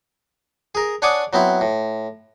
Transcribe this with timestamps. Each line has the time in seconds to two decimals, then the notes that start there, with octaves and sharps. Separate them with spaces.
0.75 G#4 A#4
1.02 D4 C#5 F#5 G#5 D6 D#6
1.33 F#3 B3 C4 E4
1.61 A2